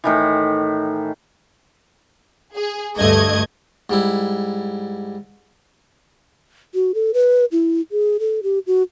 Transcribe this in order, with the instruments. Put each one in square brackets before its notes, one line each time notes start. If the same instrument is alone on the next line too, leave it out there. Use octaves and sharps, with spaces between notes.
[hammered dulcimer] A2 D#3 E3
[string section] G#4
D2 G2 A3 D#5 G#6
[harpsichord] G#2 G3 E4
[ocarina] F#4
A4
B4
E4
G#4
A4
G4
F#4